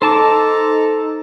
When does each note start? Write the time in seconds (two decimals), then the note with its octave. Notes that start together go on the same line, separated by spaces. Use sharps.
0.02 D#4 A4 C5 A5 A#5 D6